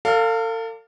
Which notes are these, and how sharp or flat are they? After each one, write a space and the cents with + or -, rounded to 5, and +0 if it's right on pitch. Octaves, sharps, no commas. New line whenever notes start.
A4 +40 D5 +0 F5 +0